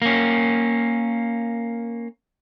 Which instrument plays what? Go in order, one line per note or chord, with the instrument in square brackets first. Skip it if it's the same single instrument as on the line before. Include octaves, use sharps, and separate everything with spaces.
[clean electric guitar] A#3 C#4